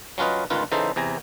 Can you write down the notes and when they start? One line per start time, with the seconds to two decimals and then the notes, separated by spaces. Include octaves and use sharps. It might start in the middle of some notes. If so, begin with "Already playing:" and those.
0.18 F#3 C#4 F4 B4 D#5
0.50 G1 C#2 D#3 F4 B4
0.72 C#3 E3 D#4 A4 C5
0.96 E2 C3 G#5 A#5